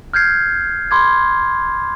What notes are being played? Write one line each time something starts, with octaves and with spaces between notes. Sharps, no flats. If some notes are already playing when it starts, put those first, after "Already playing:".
F6 G6 G#6 C7
B5 C6 D6 G#6